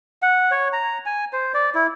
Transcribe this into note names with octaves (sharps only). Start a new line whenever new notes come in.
F#5
C#5
A#5
G#5
C5
D5
E4